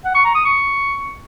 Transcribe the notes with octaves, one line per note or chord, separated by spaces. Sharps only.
F#5
C#6
A#5
D#6
C#6